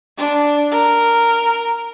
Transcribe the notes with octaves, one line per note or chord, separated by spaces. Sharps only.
D4
A#4